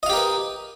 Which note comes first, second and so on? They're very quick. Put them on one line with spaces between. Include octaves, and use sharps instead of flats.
D#5 F5 G4 A#4 B4